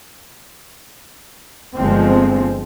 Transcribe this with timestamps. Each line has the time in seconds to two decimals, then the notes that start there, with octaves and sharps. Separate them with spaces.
1.75 G1 F3 G#3 C4